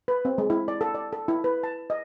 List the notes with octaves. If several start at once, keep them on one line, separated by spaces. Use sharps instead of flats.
B4
C4
G#3
E4
D5
A4
D5
A4
E4
B4
A5
D#5